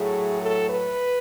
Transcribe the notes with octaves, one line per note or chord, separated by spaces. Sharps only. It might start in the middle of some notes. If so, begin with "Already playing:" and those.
Already playing: A2 F#3 A3 G#4
A4
B4